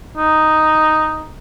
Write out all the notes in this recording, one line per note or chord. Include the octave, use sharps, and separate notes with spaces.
D#4